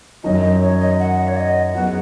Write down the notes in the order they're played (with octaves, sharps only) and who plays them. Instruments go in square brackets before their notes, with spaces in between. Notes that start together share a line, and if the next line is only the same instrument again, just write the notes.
[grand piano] F#2 D#3 F#3 C#4 [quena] D#5
[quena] D#5
C#5
D#5
F#5
C#5
D#5
[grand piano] F#2 F#3 B3 G#4 B4 [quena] F#5